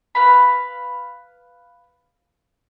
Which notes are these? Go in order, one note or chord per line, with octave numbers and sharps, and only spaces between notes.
B4 F5 B5